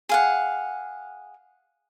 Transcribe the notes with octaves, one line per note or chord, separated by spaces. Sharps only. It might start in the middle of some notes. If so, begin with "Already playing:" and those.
G#4 F5 F#5